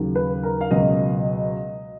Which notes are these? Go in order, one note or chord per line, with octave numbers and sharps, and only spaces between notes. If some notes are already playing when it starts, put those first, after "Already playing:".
Already playing: D#2 C#3 F#3
B4
A#4
F5
C#2 B2 F#3 D#5